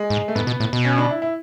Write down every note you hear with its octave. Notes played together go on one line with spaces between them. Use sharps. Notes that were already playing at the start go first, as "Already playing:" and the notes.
Already playing: G#3
G#2
A3
G#2 B3
B2
A2
B2
C#4
D4
E4
E4